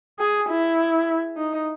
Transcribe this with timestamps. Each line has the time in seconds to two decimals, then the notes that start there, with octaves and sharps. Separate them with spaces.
0.19 G#4
0.49 E4
1.37 D#4